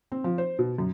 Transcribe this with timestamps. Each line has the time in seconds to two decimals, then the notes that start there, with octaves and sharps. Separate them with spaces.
0.12 C4
0.24 F3
0.38 C5
0.59 B2
0.78 F#2